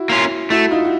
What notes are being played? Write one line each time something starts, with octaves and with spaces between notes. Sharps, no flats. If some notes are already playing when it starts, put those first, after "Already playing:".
Already playing: E4 F#4
A#3 C#4 F4
A3 E4 F#4
D#4 F4
F#4